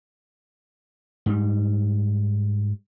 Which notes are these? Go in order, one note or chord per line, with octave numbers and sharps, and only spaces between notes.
G#2 G3